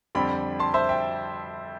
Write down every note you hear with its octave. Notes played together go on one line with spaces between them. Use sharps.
F2 D3 G3 C4 G5 B5
A5 C6
C5 E5
E5 G5